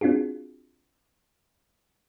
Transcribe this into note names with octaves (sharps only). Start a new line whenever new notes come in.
C4 D4 F4 F#4 G#4